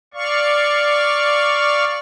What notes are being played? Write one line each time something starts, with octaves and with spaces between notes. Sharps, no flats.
D5 F5 C#6